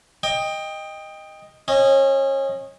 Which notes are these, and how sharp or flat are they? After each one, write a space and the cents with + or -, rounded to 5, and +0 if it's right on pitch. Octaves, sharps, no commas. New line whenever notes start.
D#5 +0 G5 +20
C#4 -30 D#5 +0